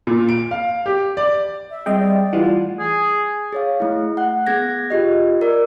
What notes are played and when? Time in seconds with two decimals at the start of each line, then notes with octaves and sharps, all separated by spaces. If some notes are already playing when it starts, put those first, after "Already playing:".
0.07 A#2
0.29 D7
0.51 F5
0.86 G4
1.17 D5
1.70 E5
1.86 G3 C4 G#4 D#5 G5
1.99 D5
2.33 A2 E3 G3 F4 F#5
2.79 G#4
3.53 G#4 C#5 F5
3.80 A3 E4
4.17 F#5 F#6
4.47 B3 G#4 G#6 A#6
4.90 F4 G4 D#5
5.41 A#4 D5